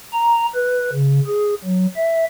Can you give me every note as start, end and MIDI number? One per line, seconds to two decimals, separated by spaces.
0.13 0.46 82
0.55 0.90 71
0.93 1.20 49
1.27 1.55 68
1.65 1.86 54
1.96 2.25 76